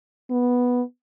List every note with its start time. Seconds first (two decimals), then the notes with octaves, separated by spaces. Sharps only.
0.30 B3